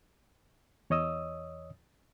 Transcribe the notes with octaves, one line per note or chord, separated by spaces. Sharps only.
E2 C#5 D#5 D#6 E6